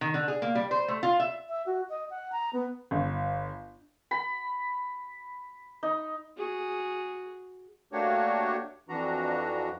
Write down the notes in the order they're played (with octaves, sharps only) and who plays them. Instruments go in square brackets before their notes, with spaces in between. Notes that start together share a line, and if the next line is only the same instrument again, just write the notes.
[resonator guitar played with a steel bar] D#3
D3
G#4
A#3
G3
C5
A3
F4
E5
[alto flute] E5
F#4
D#5
F#5
A#5
B3
[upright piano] G1
[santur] B5
D#4
[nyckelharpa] F#4 G#4
[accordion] A3 A#3 D4 F#4 G4 C#5
F2 E3 D4 F#4 A#5